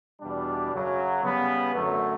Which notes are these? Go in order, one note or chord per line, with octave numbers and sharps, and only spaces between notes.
E2 B2 G3 D4
F#2 C#3 F#3
C#3 G3 B3
F#2 D3 F#3 A3